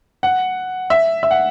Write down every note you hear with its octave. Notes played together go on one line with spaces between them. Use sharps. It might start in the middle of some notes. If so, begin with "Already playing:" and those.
F#5
E5
E5
F#5